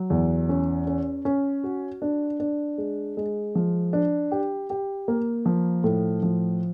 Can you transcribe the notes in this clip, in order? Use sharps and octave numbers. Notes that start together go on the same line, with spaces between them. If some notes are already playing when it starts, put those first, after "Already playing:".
Already playing: F#3
E2
C#4
C#4
C#4
F#4
D4
D4
G#3
G#3
F3
D4
G4
G4
A#3
F3
A2
F3